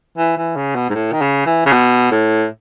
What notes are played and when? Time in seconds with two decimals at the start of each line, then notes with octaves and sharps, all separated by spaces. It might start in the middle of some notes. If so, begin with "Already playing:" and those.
0.18 E3
0.37 E3
0.56 C#3
0.75 B2
0.90 G#2
0.95 A2
1.12 D#3
1.21 C#3
1.46 E3
1.66 C#3
1.72 B2
2.11 A2